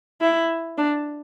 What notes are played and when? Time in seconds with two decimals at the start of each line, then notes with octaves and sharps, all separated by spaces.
0.21 E4
0.78 D4